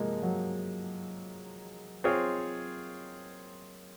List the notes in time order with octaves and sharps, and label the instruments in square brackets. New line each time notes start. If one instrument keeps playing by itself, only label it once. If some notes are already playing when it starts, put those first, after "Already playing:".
Already playing: [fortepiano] C3 F3 C4 D#4 [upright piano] G#3 A#3
[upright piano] F#3
[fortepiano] C4 F4 G#4 C#5